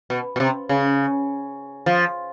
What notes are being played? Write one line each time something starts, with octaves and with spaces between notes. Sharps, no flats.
B2
B2
C3
C#3
F3